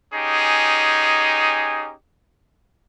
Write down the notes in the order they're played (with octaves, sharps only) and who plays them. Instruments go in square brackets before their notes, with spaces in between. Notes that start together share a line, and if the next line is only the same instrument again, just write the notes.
[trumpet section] C#4 D#4 G4 G#4